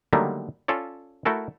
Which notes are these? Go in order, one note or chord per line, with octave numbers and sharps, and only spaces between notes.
D3 D#3 F#3 G3 A3 A#3
C#4 F4 A4 C#5 D5
A3 E4 F#4 A4 A#4